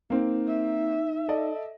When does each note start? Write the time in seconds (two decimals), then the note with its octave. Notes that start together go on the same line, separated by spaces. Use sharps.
0.10 A#3 C4 D#4
0.47 E5
1.28 A4 D5 D#5